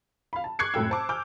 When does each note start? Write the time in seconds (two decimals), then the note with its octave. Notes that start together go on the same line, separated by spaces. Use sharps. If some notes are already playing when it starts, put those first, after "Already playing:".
0.33 F5 B5
0.44 A5
0.59 C#6 D6 F#6 G#6 C7 C#7
0.74 F#2 A2 A4 G5 E6
0.90 C5 A5 D6
1.09 G#5 D6 E6 F6 G6